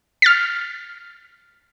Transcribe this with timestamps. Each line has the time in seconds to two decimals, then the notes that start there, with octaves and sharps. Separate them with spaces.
0.22 F6 A6 B6